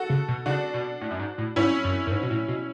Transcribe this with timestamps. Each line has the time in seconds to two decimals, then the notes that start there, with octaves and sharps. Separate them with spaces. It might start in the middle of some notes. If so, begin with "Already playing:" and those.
Already playing: F#4 A4
0.10 C#3
0.28 B2
0.46 C#3 D4 F#4
0.74 B2
1.01 A2
1.11 F#2
1.20 G#2
1.38 A2
1.56 G#2 C#4 E4
1.84 F#2
2.07 F#2
2.12 G#2
2.23 B2
2.31 A2
2.48 B2